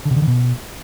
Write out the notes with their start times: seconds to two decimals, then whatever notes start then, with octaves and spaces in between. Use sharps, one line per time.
0.05 D3
0.11 C3
0.16 D3
0.22 D#3
0.28 B2